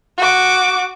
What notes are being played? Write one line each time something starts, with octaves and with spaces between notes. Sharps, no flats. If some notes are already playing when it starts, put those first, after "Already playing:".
F#4 D6